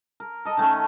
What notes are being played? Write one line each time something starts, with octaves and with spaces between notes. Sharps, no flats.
A#4
A4 D#5
D#3 A3 C#4